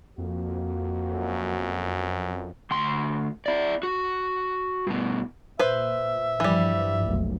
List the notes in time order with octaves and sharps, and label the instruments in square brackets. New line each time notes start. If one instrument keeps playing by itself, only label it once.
[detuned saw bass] F2 [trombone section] A#3 F#4
[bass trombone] F#2
[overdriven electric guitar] D2 C6
E4 D5
F#4
G2 B2
[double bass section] A#2 [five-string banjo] B4 C5 [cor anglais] E5
[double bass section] G2 F3 [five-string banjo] E3 G3
[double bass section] F1 B1 A#2